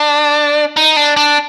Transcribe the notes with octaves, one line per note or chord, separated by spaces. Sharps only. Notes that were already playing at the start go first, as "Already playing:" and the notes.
Already playing: D4
D#4
D4
D4